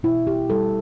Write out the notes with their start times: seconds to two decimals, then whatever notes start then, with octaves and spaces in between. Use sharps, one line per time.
0.03 B2 E4
0.27 G4
0.50 G3 A4